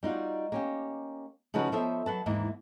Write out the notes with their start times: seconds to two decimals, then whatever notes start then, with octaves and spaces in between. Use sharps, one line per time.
0.03 G3 D#4 F4 F#4
0.52 A#3 C#4 G4
1.54 C#3 F3 C#4 D#4 F#4 B4
1.72 F3 B3 A4 C5 C#5 E5
2.06 F#3 B4 A5
2.26 D#2 G#2 E3 A#3